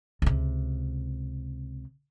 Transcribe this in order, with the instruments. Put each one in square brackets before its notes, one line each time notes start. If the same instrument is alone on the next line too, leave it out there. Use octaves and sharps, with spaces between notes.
[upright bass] C#2 C3